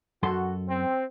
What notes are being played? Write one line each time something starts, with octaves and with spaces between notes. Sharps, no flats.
F#2 F#4 A4 C6
C4